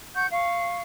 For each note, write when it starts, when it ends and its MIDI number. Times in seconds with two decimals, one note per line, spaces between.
0.15 0.27 78
0.15 0.27 85
0.15 0.27 91
0.32 0.82 77
0.32 0.82 85